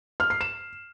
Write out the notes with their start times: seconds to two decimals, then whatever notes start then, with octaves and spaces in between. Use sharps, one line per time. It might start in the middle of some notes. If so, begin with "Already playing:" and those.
0.20 F6
0.30 C7
0.41 E7